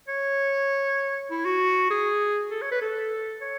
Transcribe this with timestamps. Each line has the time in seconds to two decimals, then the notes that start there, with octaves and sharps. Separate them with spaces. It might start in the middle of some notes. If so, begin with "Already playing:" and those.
0.08 C#5
1.31 E4
1.45 F#4
1.90 G#4
2.51 A4
2.62 C#5
2.72 B4
2.82 A4
3.42 C#5